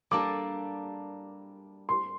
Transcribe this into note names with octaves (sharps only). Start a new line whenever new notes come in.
G3 A#3 D4 A4 D6
C6